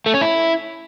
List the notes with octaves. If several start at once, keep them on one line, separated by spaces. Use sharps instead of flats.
A3
C#4
E4